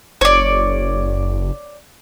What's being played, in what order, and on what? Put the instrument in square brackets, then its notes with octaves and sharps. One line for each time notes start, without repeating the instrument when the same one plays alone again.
[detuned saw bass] F#1 [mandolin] C#5 D5